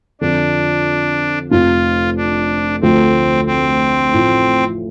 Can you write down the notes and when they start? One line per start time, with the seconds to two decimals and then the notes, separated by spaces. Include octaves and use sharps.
0.21 F2 D3 F3 D4
1.51 F1 F2 F3 F4
2.17 D4
2.82 D2 D3 F3 A3 C4
3.47 C4
4.13 A1 A2 F3